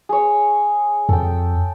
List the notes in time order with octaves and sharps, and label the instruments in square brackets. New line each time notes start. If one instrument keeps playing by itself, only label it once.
[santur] G#4 C#5
[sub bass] F2 [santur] A4 G5